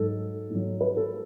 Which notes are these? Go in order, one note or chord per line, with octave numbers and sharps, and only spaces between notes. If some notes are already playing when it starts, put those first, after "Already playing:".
Already playing: G#2 F#3 A4
G#2 F#3
B4
A4